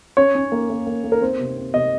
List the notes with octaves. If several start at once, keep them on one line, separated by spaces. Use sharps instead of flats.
C#4 C#5
C#4
A#3
A#3
A#3
A#3
A#4
C4 C5
C3
C4
C3 D#5